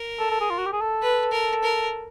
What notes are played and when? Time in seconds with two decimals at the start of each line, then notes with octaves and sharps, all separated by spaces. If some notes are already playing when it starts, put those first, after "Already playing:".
Already playing: A#4
0.19 A4
0.31 A4
0.40 G#4
0.50 F4
0.58 F#4
0.66 G4
0.73 G#4
0.81 A4
1.02 B4
1.32 A#4
1.63 A#4